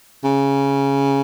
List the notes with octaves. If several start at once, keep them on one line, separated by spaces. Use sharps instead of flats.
C#3